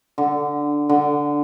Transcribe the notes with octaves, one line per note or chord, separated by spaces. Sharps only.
D3
D3